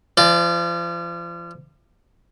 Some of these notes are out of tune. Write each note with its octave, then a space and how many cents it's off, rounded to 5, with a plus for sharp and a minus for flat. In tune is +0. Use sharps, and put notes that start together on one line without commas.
F3 -35 D5 +0